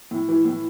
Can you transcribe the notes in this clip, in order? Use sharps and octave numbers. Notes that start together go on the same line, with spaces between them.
A2
E3
A2